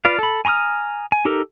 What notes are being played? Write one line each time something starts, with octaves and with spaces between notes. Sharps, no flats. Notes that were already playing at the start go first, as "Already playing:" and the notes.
F4 B4 D5 F5
A4 B5
G#5 A#5 C6 D#6 F6
G#5
D#4 G4 A4 A#4